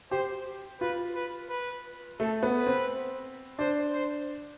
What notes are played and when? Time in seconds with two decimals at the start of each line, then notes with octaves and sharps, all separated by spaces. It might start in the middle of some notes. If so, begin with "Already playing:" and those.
0.11 G4 C5
0.81 F4 B4
1.15 B4
1.50 B4
2.20 A3 A4
2.43 B3
2.55 B4
2.66 C4
3.59 D4 C5
3.93 C5